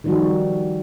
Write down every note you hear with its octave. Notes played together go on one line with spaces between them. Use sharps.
D#3 F3 G3 D#4 F#4